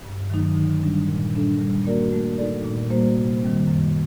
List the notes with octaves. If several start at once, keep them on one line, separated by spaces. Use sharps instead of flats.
G2
D#3 F#3 A3 D#4
D3
G3 D4
A#2
G3 D4 A4
G3
A#3 F#4 A#4 D5
A3
D#4 A4 D5
A#2
G3 A#3 F#4 C5
C3
D#3 G3 C4
F#2